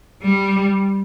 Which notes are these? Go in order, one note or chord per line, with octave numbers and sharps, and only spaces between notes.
G3